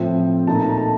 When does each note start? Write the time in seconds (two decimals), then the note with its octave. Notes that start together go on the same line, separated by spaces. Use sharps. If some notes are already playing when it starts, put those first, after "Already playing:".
Already playing: A2 F3 C4
0.47 A#2 A3 D#4 A5
0.55 A#5
0.62 A5
0.69 A#5
0.77 A5